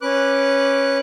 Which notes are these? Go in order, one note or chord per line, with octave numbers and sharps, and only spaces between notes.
C#4 B4 D6 F#6